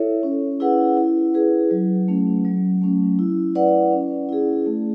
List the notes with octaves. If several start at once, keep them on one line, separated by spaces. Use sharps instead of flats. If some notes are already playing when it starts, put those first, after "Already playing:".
Already playing: E4 A4 C#5 E5
C#4
E4 G#4 B4 F#5
E4
G#4 B4
F#3
A3 C#4
F#3
A3 C#4
E4
B4 D5 F#5
C#4
E4 G#4
A3